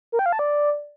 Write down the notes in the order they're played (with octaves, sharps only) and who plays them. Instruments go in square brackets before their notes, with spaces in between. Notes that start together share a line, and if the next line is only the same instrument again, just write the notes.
[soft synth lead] A#4
G5
F5
A5
D5